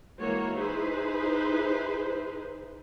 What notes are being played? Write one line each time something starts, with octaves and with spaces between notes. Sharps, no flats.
E3 G#3 A#3 F#4 C#5
D#4 E4 G#4 B4 C5